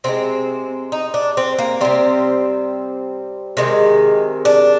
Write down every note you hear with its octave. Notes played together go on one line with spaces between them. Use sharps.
C3 D#3 G#3 C4
D#4
D4
C4
A#3
C3 G3 C4
C3 D#3 G#3
D4